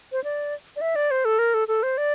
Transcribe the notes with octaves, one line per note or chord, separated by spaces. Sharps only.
C5
D5
D5
E5
D5
C5
A4
A#4
A4
A4
C5
D5